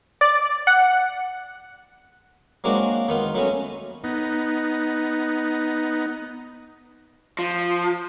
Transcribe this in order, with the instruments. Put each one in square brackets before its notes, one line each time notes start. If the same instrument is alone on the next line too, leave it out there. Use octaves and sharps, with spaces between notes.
[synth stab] D5
F#5
[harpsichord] F#3 G#3 A#3 C4 D4 F#4
D#3 B3 F4
F#3 A3 B3 C#4
[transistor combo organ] B3 D#4
[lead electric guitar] F3